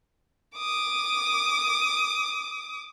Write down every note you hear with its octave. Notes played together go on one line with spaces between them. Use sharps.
D6 D#6